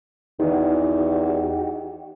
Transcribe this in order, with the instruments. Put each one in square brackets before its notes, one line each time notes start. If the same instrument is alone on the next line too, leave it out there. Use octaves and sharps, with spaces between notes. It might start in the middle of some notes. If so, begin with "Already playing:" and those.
[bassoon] E2 [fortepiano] D#3 E3 [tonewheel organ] D#4 F#4 G4